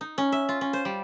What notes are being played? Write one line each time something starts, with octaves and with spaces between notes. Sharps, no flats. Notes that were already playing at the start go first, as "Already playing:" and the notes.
D#4
C#4
E5
F4
C#4
C5
G3